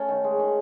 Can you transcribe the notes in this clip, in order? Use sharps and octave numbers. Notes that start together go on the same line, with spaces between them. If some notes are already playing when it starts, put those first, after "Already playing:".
Already playing: A3 C#4 A5
D#3
G#3
D#3